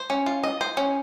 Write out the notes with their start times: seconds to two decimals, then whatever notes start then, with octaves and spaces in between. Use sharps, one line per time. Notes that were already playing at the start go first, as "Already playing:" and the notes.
Already playing: C5
0.10 C#4
0.26 F4
0.43 D#5
0.61 C5
0.77 C#4